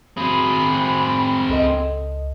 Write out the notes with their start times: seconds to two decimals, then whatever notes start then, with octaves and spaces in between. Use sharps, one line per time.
0.17 C4 G#4 B5
1.49 C#2 A4 D#5